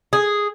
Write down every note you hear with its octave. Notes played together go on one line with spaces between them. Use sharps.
G#4